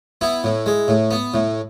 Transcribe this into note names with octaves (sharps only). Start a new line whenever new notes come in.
B3 E4
A2
G#3
A2
B3
A2